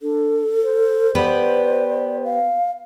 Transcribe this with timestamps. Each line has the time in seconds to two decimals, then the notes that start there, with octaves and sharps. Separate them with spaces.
0.01 D4 A4
0.63 C5
1.15 B3 G4 B4 D5
2.24 F5